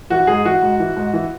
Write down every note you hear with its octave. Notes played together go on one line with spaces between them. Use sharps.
E3 F#4
G#2 G#4
E3 F#4
G#2
E3
G#2
E3